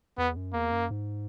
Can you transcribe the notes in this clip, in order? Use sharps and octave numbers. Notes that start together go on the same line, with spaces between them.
E2 B3
F#2
E2 A#3
F#2
G#2